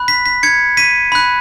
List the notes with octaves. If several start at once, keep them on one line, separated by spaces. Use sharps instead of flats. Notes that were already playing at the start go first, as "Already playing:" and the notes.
Already playing: B5 F#6
B6
B6
G#6 C#7
B6 D#7
B5 F#6